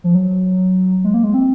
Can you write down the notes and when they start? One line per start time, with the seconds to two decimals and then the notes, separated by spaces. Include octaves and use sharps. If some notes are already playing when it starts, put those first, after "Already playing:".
0.04 F3
0.15 F#3
1.04 G#3
1.14 A#3
1.24 G#3
1.34 C4